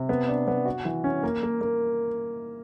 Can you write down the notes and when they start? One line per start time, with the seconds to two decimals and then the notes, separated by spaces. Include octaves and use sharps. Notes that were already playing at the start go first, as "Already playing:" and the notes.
Already playing: C3
0.09 B3
0.28 D4
0.48 B3
0.65 F#4
0.85 E3
1.04 C#4
1.23 A#3
1.43 A#3
1.61 A#3